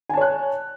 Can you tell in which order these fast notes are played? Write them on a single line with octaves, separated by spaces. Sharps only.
G#5 A5 C#5 F#6